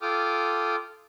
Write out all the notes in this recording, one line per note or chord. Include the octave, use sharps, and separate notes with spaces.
F4 A4 G5 D6 D#6 F6